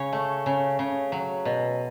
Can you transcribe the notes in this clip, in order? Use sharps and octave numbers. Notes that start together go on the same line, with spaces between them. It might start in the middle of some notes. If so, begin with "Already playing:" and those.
Already playing: C#3 C#5
A3
C#3
C#3
F#3
B2